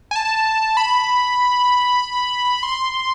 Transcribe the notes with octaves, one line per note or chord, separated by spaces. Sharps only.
G#5
A5
B5
C6